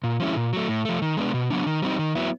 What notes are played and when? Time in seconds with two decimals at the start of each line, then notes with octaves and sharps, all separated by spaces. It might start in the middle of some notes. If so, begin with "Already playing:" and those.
0.04 A#2
0.20 F3 G#3 C#4 E4
0.36 A#2
0.53 F#3 A3
0.69 A2
0.85 F3 A3
1.02 D#3
1.17 G#3 B3 D4
1.34 B2
1.51 F#3 B3 D4
1.67 D#3
1.82 G3 C4 D#4
1.99 D#3
2.15 F#3 B3 E4